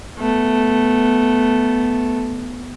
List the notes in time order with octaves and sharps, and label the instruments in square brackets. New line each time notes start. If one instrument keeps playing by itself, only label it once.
[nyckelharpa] A3 B3